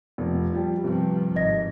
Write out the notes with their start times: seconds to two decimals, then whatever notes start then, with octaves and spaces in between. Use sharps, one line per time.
0.18 F1
0.53 F3 G3
0.84 G2 C3 F3
1.36 G#1 D#5 A#6